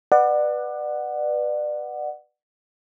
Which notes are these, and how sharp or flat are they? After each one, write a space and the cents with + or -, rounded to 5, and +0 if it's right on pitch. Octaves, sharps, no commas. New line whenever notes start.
B4 +0 D5 +30 F#5 +0